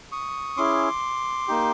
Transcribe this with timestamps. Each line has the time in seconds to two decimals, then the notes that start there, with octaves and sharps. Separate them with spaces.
0.12 C#6 D#6
0.57 C#4 E4 G#4 C6 D6
1.48 A#3 D#4 G4